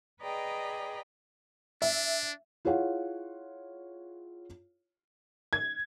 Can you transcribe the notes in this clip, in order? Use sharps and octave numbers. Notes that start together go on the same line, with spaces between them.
G#4 B4 D5 D#5 G5 A#5
D4 E5
E4 F4 G#4 C#5 F5 F#5
G#6